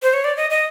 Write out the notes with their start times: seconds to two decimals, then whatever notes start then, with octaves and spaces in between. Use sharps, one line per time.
0.03 C5
0.13 C#5
0.24 D5
0.37 D#5
0.50 D#5